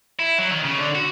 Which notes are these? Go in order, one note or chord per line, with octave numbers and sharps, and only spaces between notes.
E4
F#3
D#3
C#3
D3
F#4